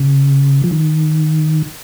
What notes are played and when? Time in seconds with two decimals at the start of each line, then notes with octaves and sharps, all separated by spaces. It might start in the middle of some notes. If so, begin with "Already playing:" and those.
Already playing: C#3
0.64 F3
0.71 D#3